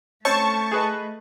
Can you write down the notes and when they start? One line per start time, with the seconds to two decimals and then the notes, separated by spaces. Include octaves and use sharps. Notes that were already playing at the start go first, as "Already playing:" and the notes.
0.25 A3 C4 C#4 C#5 A5 C#6
0.71 G#4 B4 D#5